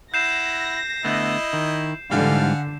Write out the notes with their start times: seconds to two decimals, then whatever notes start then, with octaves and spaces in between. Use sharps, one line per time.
0.14 E4 F#5 G6 A#6 C7 E7
1.05 D3 A3 B3 E4 D#5
1.53 D#3
2.11 G#2 D3 E3 G3 F5 F#5 G#5